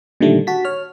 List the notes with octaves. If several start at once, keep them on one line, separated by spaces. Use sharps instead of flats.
A#2 D3 D#3 G3 A3
F#4 A5 B6
C#5 F6